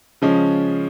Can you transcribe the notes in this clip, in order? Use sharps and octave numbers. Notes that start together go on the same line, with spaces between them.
C#3 F3 G#3 C#4